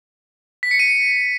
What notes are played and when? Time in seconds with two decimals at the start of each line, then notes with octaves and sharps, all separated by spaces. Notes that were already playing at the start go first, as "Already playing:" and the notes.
0.63 B6
0.71 C#7
0.79 D#7